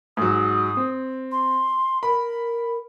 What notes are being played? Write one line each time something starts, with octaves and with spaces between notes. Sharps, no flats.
G#2 F#3 D#6
C4
C6
A#4 B5